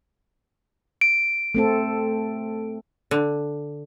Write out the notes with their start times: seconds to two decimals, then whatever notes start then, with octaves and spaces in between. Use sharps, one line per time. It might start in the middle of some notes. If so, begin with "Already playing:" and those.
1.01 D7
1.55 A3 C4 A4
3.11 D3